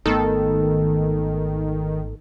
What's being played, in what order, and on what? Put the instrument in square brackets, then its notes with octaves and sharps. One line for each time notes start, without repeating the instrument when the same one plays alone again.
[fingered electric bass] G#1 A3 B3 [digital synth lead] D#3 [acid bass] A4